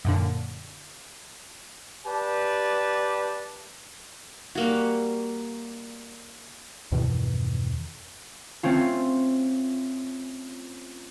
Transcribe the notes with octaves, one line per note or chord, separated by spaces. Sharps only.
F#2 A#2 D3
G4 B4 D5 A5
G3 A#3 F#4
E2 G2 B2 D#3
A3 C4 C#4 F4